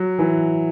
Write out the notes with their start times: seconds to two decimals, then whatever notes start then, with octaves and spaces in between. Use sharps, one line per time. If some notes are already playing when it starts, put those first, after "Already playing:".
Already playing: F#3
0.19 E3